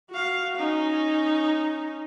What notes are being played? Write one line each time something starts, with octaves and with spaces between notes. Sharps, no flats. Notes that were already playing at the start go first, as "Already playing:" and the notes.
F#4 F5
C#4 D#4